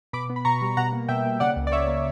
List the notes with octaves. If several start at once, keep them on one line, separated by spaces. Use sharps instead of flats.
B2 B5 D6
B3
B5
B2 A#5 C#6
G3
B2 F#5 A#5
A#3
B2 E5 G5
A#3
C#3 D5 F#5
C#2
D5
C#2 C#5 E5
A#3